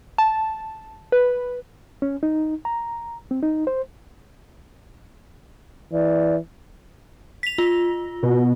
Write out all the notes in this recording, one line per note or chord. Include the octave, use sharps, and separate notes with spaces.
A5
B4
C#4
D#4
A#5
C4
D#4
C5
E3 D5
B6 F7
F4
B2